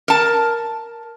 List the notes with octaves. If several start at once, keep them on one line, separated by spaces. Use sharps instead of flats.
A#4 A5